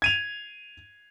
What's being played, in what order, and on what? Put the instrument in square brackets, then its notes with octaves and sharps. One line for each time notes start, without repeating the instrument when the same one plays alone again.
[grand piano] G#6 D#7 F7